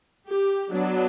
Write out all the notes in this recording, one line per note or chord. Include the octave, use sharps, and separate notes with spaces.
G4
F#3 B3 D4